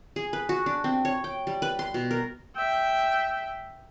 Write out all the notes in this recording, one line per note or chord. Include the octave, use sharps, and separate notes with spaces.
G#4
B4
F#4
D4
C4
C#5
G5
G3
B4
C6
B2
A#4
E5 G5